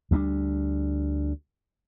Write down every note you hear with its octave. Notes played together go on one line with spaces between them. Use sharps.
D2 G3 B3 D4